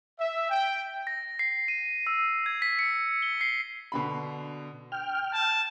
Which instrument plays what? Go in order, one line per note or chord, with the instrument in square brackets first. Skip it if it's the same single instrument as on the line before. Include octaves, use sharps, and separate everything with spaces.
[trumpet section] E5
G5
[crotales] A#6
C7
D#7
E6
G#6
B6
C#7
G7
C7
[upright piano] B2 D3 B5
[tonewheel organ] G5 F6
[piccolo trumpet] A5